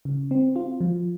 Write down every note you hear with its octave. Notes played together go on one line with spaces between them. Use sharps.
C#3
C4
F4
F3